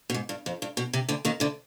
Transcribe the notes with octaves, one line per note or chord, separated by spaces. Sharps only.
B2
G#2
G2
F2
G2
B2
C3
D2 D3
D#2 D#3
D2 D3